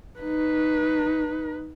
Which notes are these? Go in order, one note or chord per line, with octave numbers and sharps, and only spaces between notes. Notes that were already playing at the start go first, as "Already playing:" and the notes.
D#4 B4